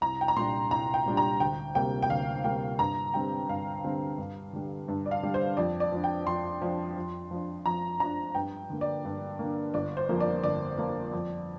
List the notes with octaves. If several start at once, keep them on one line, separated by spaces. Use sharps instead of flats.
C2 A#5
G5
A#5
A#2 G3 D4 C6
C2 A#5
G5
A#2 G3 D4
A#5
D2 G5
C3 G3 A#3 G5
G5
D2 F5
C3 G3 A#3 G5
G2 A#5
D3 G3 C4 G5
G2 F5
D3 G3 C4
G2
D3 G3
G2
D5
F5
D3 G3
C5
F2 D5
D5
F3 D4
G5
F2 C6
F3 D4
F2
F3 D4
F2 A#5
F3 D4 A#5
G2 G5
D3 A#3
D5
G2
D3 A#3
G1 D5
C5
F2 F3 A#3
D5
G1 D5
F2 F3 A#3
F2